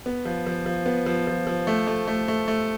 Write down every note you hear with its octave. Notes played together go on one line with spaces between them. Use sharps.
B3
F3
F3
F3
B3
F3
F3
F3
A3
A3
A3
A3
A3